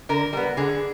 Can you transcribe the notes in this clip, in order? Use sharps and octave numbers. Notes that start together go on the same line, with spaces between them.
D3 A#4
G3 B3
D3 G#4